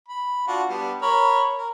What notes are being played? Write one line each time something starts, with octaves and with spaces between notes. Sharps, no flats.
B5
D4 F4 F#4
G3 B3 D4
A#4 C#5 B5
A#4